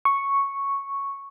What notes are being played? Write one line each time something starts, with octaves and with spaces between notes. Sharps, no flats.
C#6